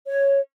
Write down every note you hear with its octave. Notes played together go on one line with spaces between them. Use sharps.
C#5